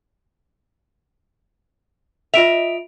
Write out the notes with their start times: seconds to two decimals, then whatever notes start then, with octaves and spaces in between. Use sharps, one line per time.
2.34 F4 D#5 E5 D7 F7